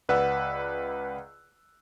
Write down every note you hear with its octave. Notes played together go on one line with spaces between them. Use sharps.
C#2 B4 D5 F#5 E6 F#6